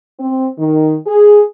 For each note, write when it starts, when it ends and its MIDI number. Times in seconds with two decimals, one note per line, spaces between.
0.19 0.47 60
0.59 0.96 51
1.06 1.41 68